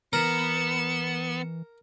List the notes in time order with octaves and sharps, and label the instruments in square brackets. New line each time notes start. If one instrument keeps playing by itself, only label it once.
[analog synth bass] E3 [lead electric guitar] B3 [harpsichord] A#4 [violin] C#7 E7